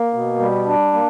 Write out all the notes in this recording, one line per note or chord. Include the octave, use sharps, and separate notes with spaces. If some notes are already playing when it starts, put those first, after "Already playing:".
Already playing: A#3
B2
G3
D4
A#3